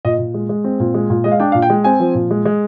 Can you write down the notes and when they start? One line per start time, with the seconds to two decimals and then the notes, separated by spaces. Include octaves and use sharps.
0.05 A#2 D#5
0.19 A#2
0.34 G#3
0.49 G#3
0.64 C4
0.80 A#2
0.94 G#3
1.10 A#2
1.24 G#3 D#5
1.32 F5
1.40 D4 G5
1.52 A#2 F5
1.62 G5
1.70 G#3
1.84 C4 G#5
2.00 F3
2.15 A#2
2.31 G#3
2.45 G#3